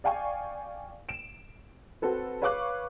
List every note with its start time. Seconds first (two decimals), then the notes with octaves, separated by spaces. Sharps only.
0.04 D5 F5 G5 G#5 C#6
1.09 D7 E7
2.02 C4 F#4 A4 B4
2.42 B4 C#5 F5 C#6 D6 F#6